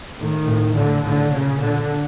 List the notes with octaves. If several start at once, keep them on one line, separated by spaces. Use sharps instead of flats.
A2 D#3
A2
A2 D3
A2 D3
A#2 C#3
A#2 D3